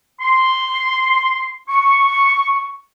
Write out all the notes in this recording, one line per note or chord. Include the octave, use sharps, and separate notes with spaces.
C6
C#6